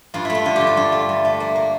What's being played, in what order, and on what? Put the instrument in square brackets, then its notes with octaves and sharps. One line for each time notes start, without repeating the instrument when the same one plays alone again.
[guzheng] G2 F4
A3 E4
F4
D3 F4
G4
G2
A4
G2 F4
A3
G2
A3
A#3
A#3